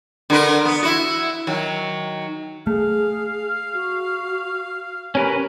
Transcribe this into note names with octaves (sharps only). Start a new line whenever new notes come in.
D3 A#4 B4
B3
E4 F#4
D#3 F#3
A3 G#4 F5
F#4
C#4 G4 A#4 B4